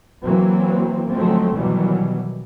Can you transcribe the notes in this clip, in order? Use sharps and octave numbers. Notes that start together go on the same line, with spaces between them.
C3 E3 F#3 A#3 C4
D3 F3 F#3 G#3 A3 C4
B2 D#3 E3 F#3 G3